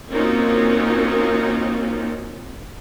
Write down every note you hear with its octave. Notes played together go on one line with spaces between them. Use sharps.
A#3 C4 C#4 D#4 F4 F#4